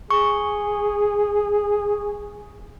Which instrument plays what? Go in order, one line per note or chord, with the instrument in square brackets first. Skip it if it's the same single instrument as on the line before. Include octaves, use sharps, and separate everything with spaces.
[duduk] G#4 [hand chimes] C#6